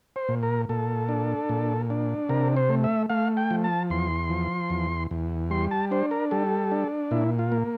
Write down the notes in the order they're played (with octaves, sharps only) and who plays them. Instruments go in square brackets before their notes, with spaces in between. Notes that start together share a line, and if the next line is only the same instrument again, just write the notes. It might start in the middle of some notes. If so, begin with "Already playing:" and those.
[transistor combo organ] C5
A#2
A#4
A#2 A4
D4
A#2
D4
C3 A#4
C5
A3
E5
A3 F5
G5
F3
A5
E2 C6
F3
E2
E2
G3 C6
A5
D4 C5
A#4
G3 A4
D4
A#2 E4
F4
A#3